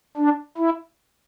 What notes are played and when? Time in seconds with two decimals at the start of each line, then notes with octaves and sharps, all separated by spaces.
0.17 D4
0.58 E4